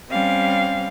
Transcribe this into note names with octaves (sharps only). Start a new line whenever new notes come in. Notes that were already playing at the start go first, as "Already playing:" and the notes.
G3 C4 C#4 F5